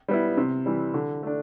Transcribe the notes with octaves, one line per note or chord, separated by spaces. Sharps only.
G3 B3 E4
C3
E3 G3
D3
A3 D4